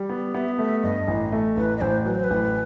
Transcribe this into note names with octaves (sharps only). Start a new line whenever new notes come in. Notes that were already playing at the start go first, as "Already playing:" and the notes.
Already playing: G3
B3
B3 E5
A3 E5
G2 D#5
A1
A3
A1 B4
D#5
A1 C5
F#3 B4
C5
B4
A1